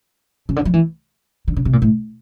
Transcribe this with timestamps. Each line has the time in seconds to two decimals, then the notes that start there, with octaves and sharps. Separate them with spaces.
0.49 C#3
0.56 D3
0.65 F3
0.73 E3
1.48 D3
1.56 C#3
1.65 C3
1.73 A#2
1.82 A2